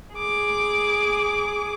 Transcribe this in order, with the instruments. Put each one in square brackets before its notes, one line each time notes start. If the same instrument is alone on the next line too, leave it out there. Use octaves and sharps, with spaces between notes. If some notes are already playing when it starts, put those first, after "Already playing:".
[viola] G#4 D6